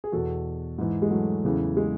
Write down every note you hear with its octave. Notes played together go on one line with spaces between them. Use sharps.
G#4
E2 B2 F#4 A4
G#2 E3
G#3
F#3 A3
E2 C#3 E3
G#3